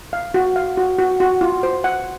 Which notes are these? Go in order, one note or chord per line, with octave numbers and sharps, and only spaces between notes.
F5
F#4
F5
F#4
F#4
F#4
F4
C5
F#5